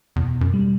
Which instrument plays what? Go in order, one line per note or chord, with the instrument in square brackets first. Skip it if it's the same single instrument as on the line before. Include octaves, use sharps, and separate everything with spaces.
[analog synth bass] E2 [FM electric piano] B2
[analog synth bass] F#2
[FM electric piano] G3